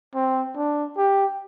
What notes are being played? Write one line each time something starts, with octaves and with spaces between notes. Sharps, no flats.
C4
D4
G4